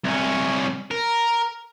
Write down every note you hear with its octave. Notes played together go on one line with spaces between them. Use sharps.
C2 C#4
A#4